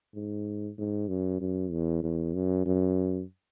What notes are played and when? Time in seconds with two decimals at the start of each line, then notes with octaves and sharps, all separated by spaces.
0.15 G#2
0.78 G#2
1.08 F#2
1.41 F#2
1.71 E2
2.03 E2
2.34 F#2
2.65 F#2